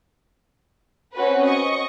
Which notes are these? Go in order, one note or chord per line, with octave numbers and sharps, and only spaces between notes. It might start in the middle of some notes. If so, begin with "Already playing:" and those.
C4 C#4 F#4 B4
D#5 C#6